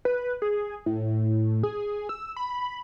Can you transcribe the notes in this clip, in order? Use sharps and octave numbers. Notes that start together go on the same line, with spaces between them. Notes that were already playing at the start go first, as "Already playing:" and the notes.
B4
G#4
A2
G#4
E6
B5